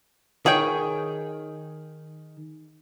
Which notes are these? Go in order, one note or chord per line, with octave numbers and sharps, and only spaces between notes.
D#3 G#4 C#5 G5